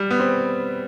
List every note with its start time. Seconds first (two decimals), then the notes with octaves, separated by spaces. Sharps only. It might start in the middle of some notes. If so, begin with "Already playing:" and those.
Already playing: G3
0.11 B3
0.19 C4